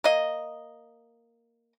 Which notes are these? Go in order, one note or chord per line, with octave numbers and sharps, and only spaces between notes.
A#3 D#5